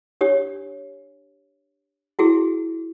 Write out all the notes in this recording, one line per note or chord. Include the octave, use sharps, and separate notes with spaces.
D4 G4 C#5
E4 F#4 G#4